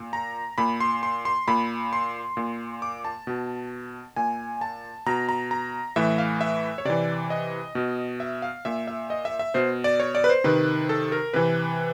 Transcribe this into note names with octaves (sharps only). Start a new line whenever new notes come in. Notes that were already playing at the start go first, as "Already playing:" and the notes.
Already playing: A#2
A#5
A#2 B5
C6
C6
C6
A#2 B5
C6
A#2
D6
A5
B2
A#2 G#5
A5
B2 A#5
A#5
A#5
A2 E3 E5
F5
E5
C#5
C3 E3 D5
D#5
B2
E5
F5
A#2 E5
E5
D#5
E5
E5
B2 C5
D5
C#5
D5
B4
C5
C3 D#3 B4
A4
A#4
C3 E3 B4